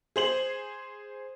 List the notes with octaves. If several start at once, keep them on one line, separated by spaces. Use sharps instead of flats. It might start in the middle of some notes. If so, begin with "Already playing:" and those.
G#4 C5 F#7